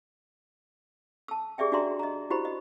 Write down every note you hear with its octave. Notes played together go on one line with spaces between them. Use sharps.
A5 E6
G4 G#4 D5 E5 G5
D4 F#4 D5 E5 A#5 C6
D#5 A#5
E4 F#4 G4 C5 B5
D#5